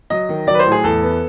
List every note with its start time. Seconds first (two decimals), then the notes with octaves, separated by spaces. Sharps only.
0.10 F#3 D#5
0.29 D#3
0.47 F#3 D5
0.55 B4
0.59 C5
0.66 A2
0.72 G#4
0.84 E2 A4
1.03 B3